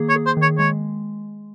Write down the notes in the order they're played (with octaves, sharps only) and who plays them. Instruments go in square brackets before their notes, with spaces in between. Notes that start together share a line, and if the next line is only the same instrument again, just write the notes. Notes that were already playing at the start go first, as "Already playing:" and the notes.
Already playing: [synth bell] D#3 A#3 G#4
[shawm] C#5
[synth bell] G#4
[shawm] C5
[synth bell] D#3
[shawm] C#5
[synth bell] G#3 [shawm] C#5